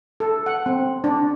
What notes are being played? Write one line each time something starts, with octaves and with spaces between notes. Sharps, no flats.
A4
F#5
C4
D4